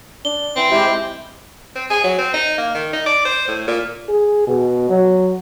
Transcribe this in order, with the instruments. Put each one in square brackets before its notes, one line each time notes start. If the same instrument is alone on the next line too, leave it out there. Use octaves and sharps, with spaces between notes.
[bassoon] D4 [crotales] G7
[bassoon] E3 [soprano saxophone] C4
[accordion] G#3 G4 C5 [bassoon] E4
[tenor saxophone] C4
G#4
F#3
C4
D#4
A#3
D#3
D#4
D5
C5
A2
A#2
[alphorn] G#4
B2
F#3